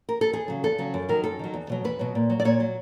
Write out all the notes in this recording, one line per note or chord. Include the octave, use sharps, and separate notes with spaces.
A#4
A4
E2 G#4
C#3 F#3
E2 A4
C#3 F#3
F#2
D#3 F#3 A#4
F#2 A4
D#3 F#3
E2
B2 F#3
E2 B4
B2 F#3
A#2
F#3
D5
A#2 C#5
F#3